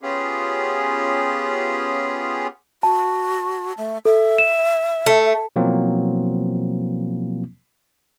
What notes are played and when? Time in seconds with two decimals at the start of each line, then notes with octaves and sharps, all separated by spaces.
0.02 B3 C#4 F4 G4 G#4
2.83 F#4 A5
3.78 A3
4.05 A4 E5
4.38 E7
5.06 A3
5.56 B2 F3 F#3 A#3 C4 E4